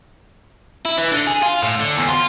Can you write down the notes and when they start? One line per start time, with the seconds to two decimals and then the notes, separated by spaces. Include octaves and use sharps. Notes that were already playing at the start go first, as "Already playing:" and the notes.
0.85 E4
0.98 E3
1.12 D3
1.27 G#4
1.43 F4
1.63 A2
1.80 D3
1.97 E2
2.09 F4